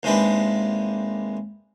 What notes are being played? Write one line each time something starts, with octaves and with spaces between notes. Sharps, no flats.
D#2 C3 G#3 D4 B4